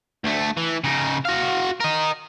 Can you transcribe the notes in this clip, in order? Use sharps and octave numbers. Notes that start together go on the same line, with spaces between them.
D2 A3
E3
C#3 D#4
F#4 F5
A#4 D#5